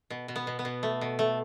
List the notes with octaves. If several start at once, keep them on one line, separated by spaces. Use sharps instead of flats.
B2
B2
B3
B2
B3
B2
A3
B2
A3